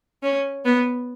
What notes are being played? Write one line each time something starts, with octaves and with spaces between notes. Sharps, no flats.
C#4
B3